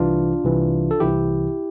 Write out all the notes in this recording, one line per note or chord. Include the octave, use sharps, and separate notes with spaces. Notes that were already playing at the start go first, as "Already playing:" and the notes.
Already playing: C2 C3 E3 D4 F4
C2 C3 E3
A4
C2 C3 E3 E4 G4